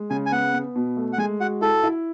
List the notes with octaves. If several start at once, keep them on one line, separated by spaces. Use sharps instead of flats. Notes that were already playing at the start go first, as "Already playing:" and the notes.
Already playing: G#3
C#3 G#5
G#5
B3 F#5
B3
B2
A3
F#5
G#3 G#5
F#4 F#5
E4 A4
E4